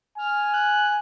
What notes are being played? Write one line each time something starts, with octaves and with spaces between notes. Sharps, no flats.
G#5 F6
F#6